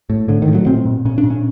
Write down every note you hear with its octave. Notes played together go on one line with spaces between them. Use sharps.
A2
A2 D3
D#3
A2
F#3
A#2 C4
A#2
A#2 C#4
D4
A#2
C#4